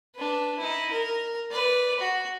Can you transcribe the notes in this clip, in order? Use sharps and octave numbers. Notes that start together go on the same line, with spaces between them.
D4 B4
D#4 E4
A#4
B4 D5
F#4